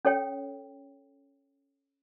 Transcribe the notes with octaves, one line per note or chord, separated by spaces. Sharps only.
C#4 A4 C#5 G5